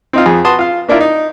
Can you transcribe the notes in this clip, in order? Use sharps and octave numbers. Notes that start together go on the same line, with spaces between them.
C4 D#4 F4
F2 G#4
F#4 B4 A5 C6 D#6
F4 F5
A#3 D4 E4 F4 A#4
D#4